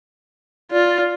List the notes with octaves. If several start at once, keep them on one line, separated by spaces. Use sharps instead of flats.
F4 D5